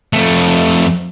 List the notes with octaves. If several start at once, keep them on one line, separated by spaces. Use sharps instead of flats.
F2 A3